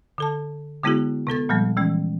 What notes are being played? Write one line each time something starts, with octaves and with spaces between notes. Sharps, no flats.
D3 A4 A5
D3 G#3 B3 E4 F#4 G#4
C3 B3 A4 A6
A#2 F3 G3 G#3 A#3
E3 G#3 C#4